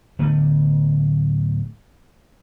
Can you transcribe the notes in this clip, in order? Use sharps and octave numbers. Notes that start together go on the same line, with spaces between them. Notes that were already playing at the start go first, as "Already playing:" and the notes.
D1 D3 A3 B3